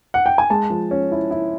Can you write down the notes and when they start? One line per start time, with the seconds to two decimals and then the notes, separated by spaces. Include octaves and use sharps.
0.14 F#5
0.26 G5
0.38 G#5
0.50 G#3 A5
0.70 F3
0.91 C#4
1.12 E4
1.31 E4